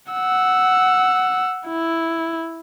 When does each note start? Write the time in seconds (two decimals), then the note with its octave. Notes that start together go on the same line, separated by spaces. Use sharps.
0.12 F#5 E6
1.67 E4